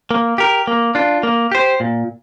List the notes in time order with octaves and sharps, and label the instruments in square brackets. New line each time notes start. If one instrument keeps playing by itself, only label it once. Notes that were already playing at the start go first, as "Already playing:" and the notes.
[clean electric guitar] A#3
G4 A#4
A#3
D4 F4
A#3
G4 C5
A#2